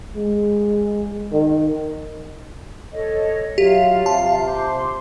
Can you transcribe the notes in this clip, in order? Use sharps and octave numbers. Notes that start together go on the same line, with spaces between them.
G#3
D#3
A4 C#5 D#5
F#3 F4 G4 E5 F5
C3 A5
C5 C6 D6